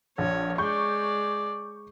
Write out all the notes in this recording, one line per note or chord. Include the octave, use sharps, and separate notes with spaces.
A#1 C#5
G#3 D5 C#6 G6